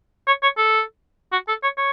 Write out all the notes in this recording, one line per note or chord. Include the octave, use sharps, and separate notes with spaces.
C#5
C#5
A4
F#4
A4
C#5
C#5